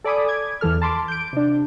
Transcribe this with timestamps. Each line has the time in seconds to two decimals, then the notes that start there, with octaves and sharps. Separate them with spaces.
0.04 A4 D5 G#5 B5 D6 D#6
0.28 D6 G#6
0.61 E2 E3 A4 F6
0.82 A5 B5 C6 D6
1.08 G6 D7
1.33 C3 D4